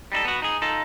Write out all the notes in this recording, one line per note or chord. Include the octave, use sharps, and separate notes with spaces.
G3 D#4 E4 A4
B3 F#4
D#4 G#4
D#4 F4 A4